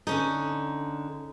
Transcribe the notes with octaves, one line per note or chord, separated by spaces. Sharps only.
D3 C#4 D#4 A4